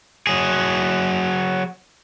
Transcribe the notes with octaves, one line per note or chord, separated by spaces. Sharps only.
F#3 G#4